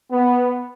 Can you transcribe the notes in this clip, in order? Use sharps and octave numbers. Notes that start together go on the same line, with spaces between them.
B3